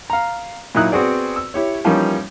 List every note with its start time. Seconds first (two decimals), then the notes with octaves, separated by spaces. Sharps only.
0.10 F5 A#5
0.75 A#2 F#3 D#4 E4 D#6 F#6
0.92 B3 C4 F#4 G#4 D5
1.36 E6
1.54 E4 G4 C#5
1.84 E3 F3 G3 A#3 C#4 D#4